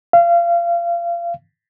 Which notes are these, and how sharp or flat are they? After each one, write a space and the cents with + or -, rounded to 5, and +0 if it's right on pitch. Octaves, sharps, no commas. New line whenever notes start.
F5 -30